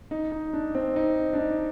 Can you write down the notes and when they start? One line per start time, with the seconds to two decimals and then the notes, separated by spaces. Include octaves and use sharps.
0.11 D#4
0.32 D#4
0.53 D4
0.75 C4
0.96 D#4
1.33 D4
1.38 D#4